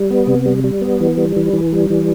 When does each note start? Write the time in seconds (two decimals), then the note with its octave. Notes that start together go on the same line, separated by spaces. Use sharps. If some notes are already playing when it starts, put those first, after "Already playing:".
Already playing: G3
0.11 B3
0.27 C3
0.46 G3
0.64 G3
0.81 B3
1.00 E3
1.17 G3
1.36 E3
1.53 E3
1.72 G3
1.90 E3